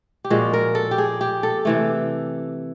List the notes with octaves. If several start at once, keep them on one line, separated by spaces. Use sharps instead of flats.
G4
A#2 F3 G#3 F#4
A#4
A4
G4
G#4
G4
A4
C3 E3 A3